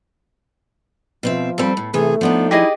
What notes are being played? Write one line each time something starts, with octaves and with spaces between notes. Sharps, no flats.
B2 F3 C4 E5
G3 C4 A4 B5
A2
C3 E3 A3 G#4
F3 B3 D4 D#4
E4 G4 G#4 D#5